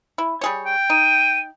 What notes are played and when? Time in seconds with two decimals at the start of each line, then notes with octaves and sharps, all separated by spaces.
0.18 E4
0.41 G3 G#4 C#5
0.66 G5
0.90 D#4 D#7